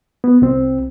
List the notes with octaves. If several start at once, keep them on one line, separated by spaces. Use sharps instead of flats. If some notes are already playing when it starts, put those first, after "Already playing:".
B3
C2 C4